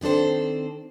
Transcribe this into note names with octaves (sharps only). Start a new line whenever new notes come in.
D#3 C4 D4 A4 C5